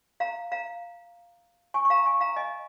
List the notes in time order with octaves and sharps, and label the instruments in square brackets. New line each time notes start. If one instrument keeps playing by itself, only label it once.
[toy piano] F5 A#5
F5 A#5
G#5 C#6
C#6
F5 A#5
G#5 C#6
F5 A#5
D#5 G#5